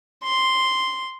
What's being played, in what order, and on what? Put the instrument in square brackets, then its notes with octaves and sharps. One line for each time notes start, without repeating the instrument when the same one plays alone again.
[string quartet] C6